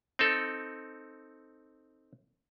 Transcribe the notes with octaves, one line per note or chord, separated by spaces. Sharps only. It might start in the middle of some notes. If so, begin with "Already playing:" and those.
C4 D#4 A4